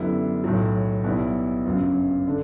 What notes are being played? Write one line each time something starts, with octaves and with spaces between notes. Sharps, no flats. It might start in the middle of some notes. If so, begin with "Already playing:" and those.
Already playing: F#2 D3 G3 B3 E4
B1 A2 F#3
B1 B2 G3 B3 E4
G1 F#2 C#3 F#3
D3